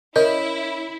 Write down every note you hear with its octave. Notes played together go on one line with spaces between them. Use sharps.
C#4 E4 A#4 D#5